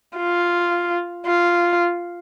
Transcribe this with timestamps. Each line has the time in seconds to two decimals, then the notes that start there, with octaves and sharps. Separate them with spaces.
0.17 F4
1.26 F4